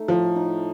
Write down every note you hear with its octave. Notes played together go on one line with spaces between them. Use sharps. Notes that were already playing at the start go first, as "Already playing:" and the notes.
Already playing: A3 D#4
A2 F3
D#4